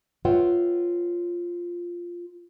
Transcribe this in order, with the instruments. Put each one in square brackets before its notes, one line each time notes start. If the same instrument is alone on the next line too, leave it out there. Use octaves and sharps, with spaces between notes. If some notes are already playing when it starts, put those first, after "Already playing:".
[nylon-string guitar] F4 B4 C#5 E5 F#5 G5